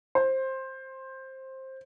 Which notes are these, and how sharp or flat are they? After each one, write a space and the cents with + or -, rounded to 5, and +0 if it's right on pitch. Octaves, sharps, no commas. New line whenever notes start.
C5 +15